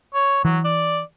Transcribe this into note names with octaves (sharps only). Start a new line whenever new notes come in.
C#5
E3 F#3
D5